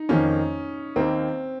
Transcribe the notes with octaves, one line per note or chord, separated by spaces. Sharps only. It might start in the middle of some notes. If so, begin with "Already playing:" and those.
Already playing: D#4
F2 D#3 A#3 C#4
D#2 D#3 A#3 C4